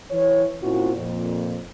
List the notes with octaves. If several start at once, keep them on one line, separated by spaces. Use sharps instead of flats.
E3 C#5
A#2 C4 C#4 E4 F#4
F2 A#2